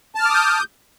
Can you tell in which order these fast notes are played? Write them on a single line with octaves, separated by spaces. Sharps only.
A5 F6 D6 D#6 G6